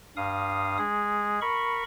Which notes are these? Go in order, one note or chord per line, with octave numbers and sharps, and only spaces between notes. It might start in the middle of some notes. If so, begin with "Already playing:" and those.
G2 F5 D#6
G#3 G#4
A#4 B5 C#6